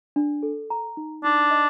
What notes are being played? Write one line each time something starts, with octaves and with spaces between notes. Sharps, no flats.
D4
A4
A#5
D#4
D4 D#4
D#5